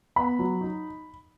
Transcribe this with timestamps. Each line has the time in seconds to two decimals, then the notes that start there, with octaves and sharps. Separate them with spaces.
0.16 B3 B5
0.39 F#3
0.61 D#4